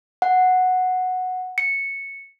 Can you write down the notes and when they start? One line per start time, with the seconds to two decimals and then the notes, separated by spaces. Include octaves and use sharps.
0.22 F#5
1.58 C#7